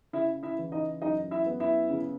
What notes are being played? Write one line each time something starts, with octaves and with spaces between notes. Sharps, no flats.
C#3 E4 E5
E4 E5
E3
D#4 D#5
F#2 D#4 D#5
E4 E5
B3
E4 E5
C#3